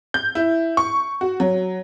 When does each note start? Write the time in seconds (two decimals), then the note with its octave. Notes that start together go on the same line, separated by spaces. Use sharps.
0.14 G6
0.35 E4
0.77 C#6
1.21 F#4
1.40 F#3